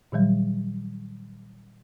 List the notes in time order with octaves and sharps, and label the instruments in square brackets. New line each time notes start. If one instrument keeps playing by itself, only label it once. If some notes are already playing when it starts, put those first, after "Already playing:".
[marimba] A#2 D#3 F#3 G3